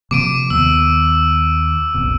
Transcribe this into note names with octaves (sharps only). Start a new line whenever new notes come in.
C3 F3 A#3 D6 D7 D#7
D#2 D#3 B3 E6
F#1 C2 B2